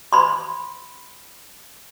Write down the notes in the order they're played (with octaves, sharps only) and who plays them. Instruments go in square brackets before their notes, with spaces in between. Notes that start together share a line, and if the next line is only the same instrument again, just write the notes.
[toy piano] B5 C6